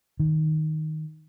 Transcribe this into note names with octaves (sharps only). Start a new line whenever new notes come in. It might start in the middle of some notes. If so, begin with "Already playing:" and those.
D#3